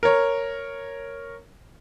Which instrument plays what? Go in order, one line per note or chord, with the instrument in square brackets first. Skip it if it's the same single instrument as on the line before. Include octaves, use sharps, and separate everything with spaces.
[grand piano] A#4 C#5